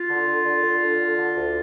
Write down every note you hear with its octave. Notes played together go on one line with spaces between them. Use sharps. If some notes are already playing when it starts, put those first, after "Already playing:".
Already playing: F4
D3
D3
D3
D3
D3
D3
D3
D2